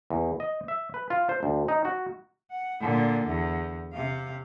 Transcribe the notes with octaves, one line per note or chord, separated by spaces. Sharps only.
E2
D#5
E5
B4
F4
C5
D2
D#4
F#4
F#5
A#2 D3
E2
C3 F5